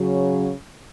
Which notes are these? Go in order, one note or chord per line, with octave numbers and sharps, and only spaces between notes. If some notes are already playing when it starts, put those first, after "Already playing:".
Already playing: C#3 F#3